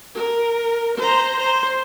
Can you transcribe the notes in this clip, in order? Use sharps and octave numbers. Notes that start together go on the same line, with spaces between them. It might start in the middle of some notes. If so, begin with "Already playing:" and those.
A#4
C5 A#5
C5